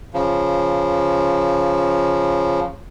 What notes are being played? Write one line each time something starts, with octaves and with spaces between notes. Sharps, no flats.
C#3 F3